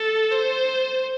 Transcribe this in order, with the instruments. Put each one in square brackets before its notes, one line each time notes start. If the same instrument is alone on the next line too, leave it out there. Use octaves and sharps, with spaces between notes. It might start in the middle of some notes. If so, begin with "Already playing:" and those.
Already playing: [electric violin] A4
C5